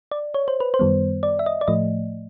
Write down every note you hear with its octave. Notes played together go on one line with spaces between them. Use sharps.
D5
C#5
C5
B4
C5
F#2 D#3 G3 B3
D5
E5
D#5
D5
A2 F3 A3 D#5